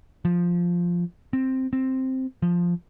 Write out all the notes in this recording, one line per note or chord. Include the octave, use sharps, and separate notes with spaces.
F3
C4
C4
F3